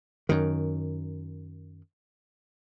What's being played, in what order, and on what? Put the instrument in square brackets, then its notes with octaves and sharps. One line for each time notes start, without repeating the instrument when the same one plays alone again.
[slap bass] F#2 D#3